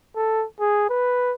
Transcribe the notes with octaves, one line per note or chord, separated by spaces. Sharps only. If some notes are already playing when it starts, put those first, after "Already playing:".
A4
G#4
B4